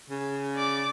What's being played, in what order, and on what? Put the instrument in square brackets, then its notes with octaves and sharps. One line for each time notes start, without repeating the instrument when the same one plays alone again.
[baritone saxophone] C#3
[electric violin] D5 D6